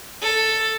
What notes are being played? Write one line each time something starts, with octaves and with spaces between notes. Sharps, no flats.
A4